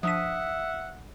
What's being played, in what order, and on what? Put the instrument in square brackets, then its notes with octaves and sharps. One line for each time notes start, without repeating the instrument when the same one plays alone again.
[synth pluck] F3 D4 D#7 [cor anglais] E5 [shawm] F#5 [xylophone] D#6 B6